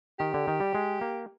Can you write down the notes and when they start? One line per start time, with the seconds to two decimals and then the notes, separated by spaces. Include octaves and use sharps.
0.19 D#3 G4
0.34 D3
0.48 D#3
0.60 G3
0.75 G#3
1.01 A#3